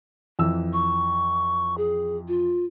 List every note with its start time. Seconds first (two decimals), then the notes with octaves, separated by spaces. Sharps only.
0.39 F2 E3 E6
0.73 C#6
1.78 G#4
2.28 F4